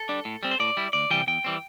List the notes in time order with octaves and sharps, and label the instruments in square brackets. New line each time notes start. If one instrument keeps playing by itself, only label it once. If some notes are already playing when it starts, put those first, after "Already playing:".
Already playing: [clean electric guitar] A4
G3 D4
A2
G3 C4
C5
A2 D5
G3 E4
D2 D5
C3 E3 G3 G5
E2 G5
E3 G3 C4